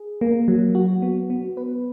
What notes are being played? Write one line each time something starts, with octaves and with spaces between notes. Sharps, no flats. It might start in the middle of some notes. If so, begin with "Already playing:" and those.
Already playing: G#4
A#3
F#3
F#4
B3
B3
B4